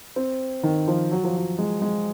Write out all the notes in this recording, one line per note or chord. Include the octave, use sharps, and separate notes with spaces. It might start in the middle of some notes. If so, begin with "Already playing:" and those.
C4
D#3
F3
F#3
F3
F#3
G#3
G#3